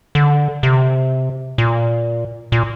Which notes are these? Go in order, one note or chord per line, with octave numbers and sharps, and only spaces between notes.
D3
C3
A#2
A#2